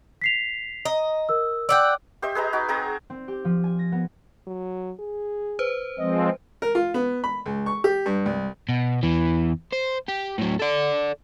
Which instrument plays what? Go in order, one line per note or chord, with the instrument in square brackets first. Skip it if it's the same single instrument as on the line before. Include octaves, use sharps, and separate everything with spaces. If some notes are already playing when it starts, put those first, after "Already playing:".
[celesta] B6 C7 F7
[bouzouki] D#5 [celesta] A#5
[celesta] A#4 E6
[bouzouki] D5 F#5 G5 [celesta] E6 G6
[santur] G4 C5 D#5 E5
G#4 B4 D#5 A#5
D#4 F#4 B5 D6
C4 G#4 A#5 D#6
[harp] C4
G4
F3
G#5
A#6
B3
[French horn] F#3
G#4
[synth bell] B4 C5
[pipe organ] F3 G#3 C4 [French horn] D#5
[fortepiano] A#4
F4
B3
B5
C#2
C#6
G4
G2
C2
[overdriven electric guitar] B2
E2 E3
C5
G4
A2 F#3
A4 D5